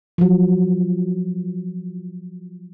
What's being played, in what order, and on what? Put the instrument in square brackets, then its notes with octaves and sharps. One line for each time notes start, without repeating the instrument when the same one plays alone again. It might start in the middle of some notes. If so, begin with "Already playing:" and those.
[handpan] F3 F#3